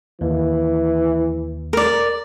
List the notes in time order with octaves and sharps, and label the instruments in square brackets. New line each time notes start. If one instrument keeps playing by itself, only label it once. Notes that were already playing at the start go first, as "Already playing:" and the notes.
[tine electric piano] D#2 [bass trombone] E3
[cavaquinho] A#4 D5